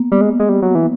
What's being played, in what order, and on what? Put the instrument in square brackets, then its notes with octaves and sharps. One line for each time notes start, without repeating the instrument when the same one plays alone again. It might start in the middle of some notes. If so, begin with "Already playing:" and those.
Already playing: [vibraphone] A#3 B3
[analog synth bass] G3
G#3
G#3
G3
F#3
E3